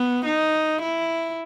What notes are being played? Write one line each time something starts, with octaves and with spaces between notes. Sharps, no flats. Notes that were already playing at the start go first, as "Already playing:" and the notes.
Already playing: B3
D#4
E4